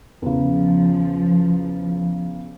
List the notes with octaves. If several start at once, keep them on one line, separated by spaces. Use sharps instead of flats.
E2 C#3 F3